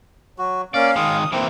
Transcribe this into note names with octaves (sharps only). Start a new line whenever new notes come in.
F#3 F#4
A#3 C#4 D5 F5
D#3 G#3 D#6
E3 A#3 C4